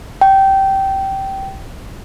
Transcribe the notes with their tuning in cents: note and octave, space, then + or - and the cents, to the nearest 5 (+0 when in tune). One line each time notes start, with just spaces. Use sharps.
G5 -15